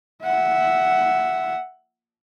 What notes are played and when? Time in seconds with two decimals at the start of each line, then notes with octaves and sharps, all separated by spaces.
0.23 E5 F#5